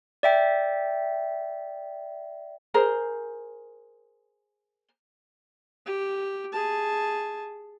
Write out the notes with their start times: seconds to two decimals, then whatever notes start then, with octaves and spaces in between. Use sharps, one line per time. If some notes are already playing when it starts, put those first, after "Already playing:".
0.23 D5 E5 G5
2.74 G#4 A#4 C5
5.86 G4
6.52 G#4 A5